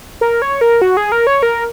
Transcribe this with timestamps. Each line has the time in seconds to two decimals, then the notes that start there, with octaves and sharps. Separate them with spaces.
0.21 A#4
0.42 C#5
0.61 A#4
0.82 F#4
0.97 G#4
1.12 A#4
1.27 C#5
1.43 A#4